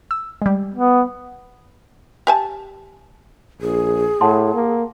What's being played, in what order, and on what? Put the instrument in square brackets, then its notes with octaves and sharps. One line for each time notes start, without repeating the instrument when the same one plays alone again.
[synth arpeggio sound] E6
G3 G#3
[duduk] B3
[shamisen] G4 G#5 A5
[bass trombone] A#1 [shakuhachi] G#4
[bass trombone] A2 [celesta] F#5 A5 C6
[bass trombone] A#3